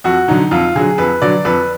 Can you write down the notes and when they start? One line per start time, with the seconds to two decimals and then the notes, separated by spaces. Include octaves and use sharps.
0.04 F2 F#4
0.28 D3 F#3 D#4
0.51 F2 F4
0.76 D3 F#3 G#4
0.98 F2 B4
1.22 D3 F#3 D5
1.45 F2 B4